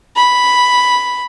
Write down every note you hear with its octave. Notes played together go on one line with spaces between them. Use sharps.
B5